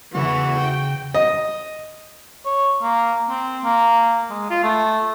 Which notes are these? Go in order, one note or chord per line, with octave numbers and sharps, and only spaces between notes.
E2 C#3 E3 F#4
G5
D#5
C#5
A#3
C4
A#3
G#3
F4
A3